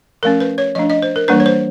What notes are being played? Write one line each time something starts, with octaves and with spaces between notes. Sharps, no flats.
F3 A3 C#4 A#4
B4
C#5
F3 A3 D4 D#5
D#5
C5
A#4
E3 G3 A#3 D4 B4
C#5
C5